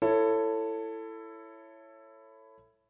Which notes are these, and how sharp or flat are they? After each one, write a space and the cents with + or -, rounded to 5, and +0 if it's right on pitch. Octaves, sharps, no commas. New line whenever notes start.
E4 +15 A4 +15 C#5 -10